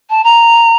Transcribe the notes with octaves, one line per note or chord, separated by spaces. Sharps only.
A5
A#5